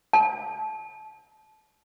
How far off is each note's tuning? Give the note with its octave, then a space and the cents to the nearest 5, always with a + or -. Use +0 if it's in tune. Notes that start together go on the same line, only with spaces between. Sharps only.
A5 -25